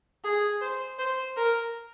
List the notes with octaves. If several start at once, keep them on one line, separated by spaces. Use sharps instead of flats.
G#4
C5
C5
A#4